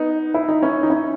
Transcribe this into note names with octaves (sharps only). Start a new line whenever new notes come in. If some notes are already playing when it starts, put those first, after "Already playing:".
Already playing: B3 D#4
E4
D#4
C#4 E4
D#4
C#4 E4